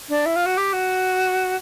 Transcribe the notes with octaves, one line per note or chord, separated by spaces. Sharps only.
D4
E4
F4
F#4
G4
F#4